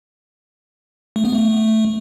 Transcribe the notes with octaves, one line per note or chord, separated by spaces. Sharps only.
A3
B3
A3